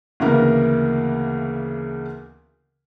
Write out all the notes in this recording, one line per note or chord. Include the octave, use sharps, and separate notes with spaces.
D2 C#3 E3 A#3 B3 A#4